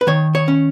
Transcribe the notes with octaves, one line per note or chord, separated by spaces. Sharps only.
B4
D#3 C#5
C#5
C#4